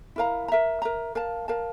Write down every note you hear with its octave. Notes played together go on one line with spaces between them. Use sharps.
E4 A#4 F5 A#5
A#4 E5 A#5
A#4 E5 A#5
A#4 F5 A5
A#4 F5 A5